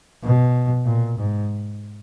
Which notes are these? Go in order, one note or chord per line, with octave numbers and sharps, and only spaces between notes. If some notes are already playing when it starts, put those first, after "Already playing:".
B2
A#2
G#2